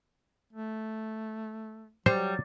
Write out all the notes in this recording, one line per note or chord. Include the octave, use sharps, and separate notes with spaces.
A3
F#3 G3 C5